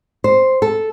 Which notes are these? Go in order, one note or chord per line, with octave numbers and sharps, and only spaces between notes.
C5
A4